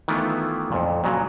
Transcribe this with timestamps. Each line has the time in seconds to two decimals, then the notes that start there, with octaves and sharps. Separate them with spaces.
0.08 D#3 E3 A3 B3 E4 F4
0.72 F2 A#2
1.04 A#2 C#3 F#3